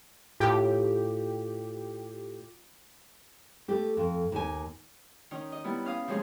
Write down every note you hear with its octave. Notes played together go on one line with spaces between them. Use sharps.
A2 F4 G4
A3 G4
F2
D#2 G#5
D#3 C#4 D#4
D#5
G3 B3 E4
C#4 F5 D#6
C3 F3 G#3 C#4 D#4 G#4